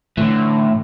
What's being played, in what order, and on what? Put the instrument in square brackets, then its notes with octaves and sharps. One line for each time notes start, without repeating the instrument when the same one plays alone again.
[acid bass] A2 [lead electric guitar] D3 E3 [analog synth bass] A3